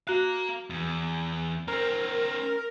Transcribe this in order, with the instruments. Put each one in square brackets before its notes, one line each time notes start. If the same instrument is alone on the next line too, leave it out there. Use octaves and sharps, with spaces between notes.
[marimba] F#4 F#6 [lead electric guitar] F5 A#5
[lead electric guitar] E2
[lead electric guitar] C#4 C5 [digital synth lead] A#4